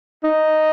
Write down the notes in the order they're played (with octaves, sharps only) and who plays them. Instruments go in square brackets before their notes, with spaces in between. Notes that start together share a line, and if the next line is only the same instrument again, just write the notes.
[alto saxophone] D#4